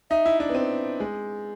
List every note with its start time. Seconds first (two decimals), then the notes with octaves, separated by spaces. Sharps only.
0.10 D#4 E5
0.25 E4
0.40 D4
0.49 B3
0.55 C4
1.00 G#3